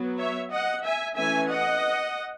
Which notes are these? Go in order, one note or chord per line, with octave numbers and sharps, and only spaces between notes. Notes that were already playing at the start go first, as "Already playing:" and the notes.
Already playing: F#3 B3
C#5 E5
D#5 F#5
E5 G#5
E3 A3 C#4 E5 G#5
D#5 F#5